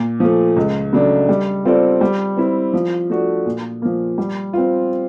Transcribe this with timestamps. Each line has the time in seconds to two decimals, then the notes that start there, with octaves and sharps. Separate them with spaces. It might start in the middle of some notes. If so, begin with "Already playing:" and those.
Already playing: A#2
0.20 F3 A3
0.57 C#2
0.93 C#3 F#3 A3 D4
1.29 G3
1.65 C4 F4 A4 D5
2.01 G3
2.37 C4 E4
2.74 F3
3.10 A3 D4 F#4
3.46 A#2
3.82 F3 A#3
4.18 G3
4.53 C4 F4